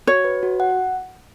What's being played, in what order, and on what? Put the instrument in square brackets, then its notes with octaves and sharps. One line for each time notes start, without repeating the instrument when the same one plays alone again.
[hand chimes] F#4 [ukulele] C#5
[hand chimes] B4
F#4
F#5